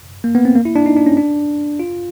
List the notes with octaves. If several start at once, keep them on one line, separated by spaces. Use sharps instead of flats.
A#3
B3
C4
A#3
E4
D4
D#4
D4
C#4
D4
F4